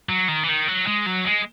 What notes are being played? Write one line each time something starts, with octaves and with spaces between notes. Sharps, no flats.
F#3
D#3
E3
D#3
F#3
G#3
F#3
G#3